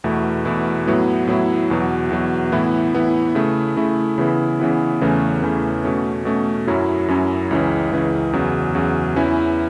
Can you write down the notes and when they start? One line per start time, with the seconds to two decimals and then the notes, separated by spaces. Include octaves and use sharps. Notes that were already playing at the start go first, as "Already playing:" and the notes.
0.04 E2 B2 A3 E4
0.45 E2 B2 A3 E4
0.87 A2 F#3 B3 E4
1.28 A2 F#3 B3 E4
1.70 E2 B2 F#3
2.10 E2 B2 F#3
2.52 A2 E3 B3 E4
2.94 A2 E3 B3 E4
3.35 C#3 A3 E4
3.77 C#3 A3 E4
4.18 C#3 E3 B3 E4
4.60 C#3 E3 B3 E4
5.01 E2 C#3 E3 A3 C#4
5.42 E2 C#3 E3 A3 C#4
5.84 B2 A3 C#4
6.25 B2 A3 C#4
6.67 F#2 F#3 C#4 E4
7.08 F#2 F#3 C#4 E4
7.51 C#2 C#3 E3 C#4
7.92 C#2 C#3 E3 C#4
8.33 E2 C#3 F#3
8.75 E2 C#3 F#3
9.16 E2 E3 C#4 E4